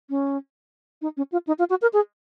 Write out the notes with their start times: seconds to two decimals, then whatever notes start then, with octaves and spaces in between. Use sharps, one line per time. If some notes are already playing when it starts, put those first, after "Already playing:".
0.10 C#4
1.02 D#4
1.17 C#4
1.32 F4
1.47 D#4
1.59 F4
1.70 F#4
1.82 A#4
1.93 G#4